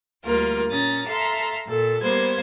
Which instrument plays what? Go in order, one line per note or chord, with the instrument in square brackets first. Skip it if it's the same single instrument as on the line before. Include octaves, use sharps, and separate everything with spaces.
[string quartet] D2 G3 A#3 F4 A#4
A#2 C#4 A#5 D#6 A6
A4 E5 F5 A#5 C6
A#2 A4
G3 A#3 B3 C5 G#6